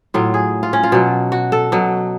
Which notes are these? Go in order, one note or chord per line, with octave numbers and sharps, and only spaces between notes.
A2 F#3 F4
G#4
F4
C#4
F4
B2 F#3
F#4
A4
B2 F#3